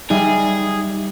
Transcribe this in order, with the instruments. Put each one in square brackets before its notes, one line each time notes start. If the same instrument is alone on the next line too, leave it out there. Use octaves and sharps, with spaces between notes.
[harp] G3 [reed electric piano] D#4 E5 [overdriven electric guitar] G#4